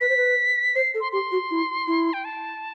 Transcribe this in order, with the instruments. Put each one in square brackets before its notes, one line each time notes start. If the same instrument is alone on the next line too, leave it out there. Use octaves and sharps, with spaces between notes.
[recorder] B4 [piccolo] B6
[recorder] C5
B4
[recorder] C5 [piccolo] C7
[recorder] A4
[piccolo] C6
[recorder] G4 [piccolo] C6
[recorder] F#4
E4
E4
[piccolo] G5
A5